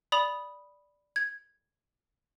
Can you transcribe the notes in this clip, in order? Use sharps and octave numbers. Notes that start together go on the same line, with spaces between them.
D5 B5 D#6 F7 F#7
G#6